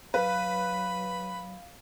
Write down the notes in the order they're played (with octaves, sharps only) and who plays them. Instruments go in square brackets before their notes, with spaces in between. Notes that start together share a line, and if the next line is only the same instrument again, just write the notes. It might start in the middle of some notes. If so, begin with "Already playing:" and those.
[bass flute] F#3 [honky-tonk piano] B4 [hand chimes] F5 [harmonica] B5